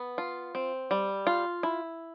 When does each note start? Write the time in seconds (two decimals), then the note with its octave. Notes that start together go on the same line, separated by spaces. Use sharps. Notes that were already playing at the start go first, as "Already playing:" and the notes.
Already playing: B3
0.18 F4
0.55 C4
0.91 G3
1.27 F4
1.63 E4